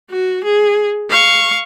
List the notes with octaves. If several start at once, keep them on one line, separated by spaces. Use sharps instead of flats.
F#4
G#4
F5 C#6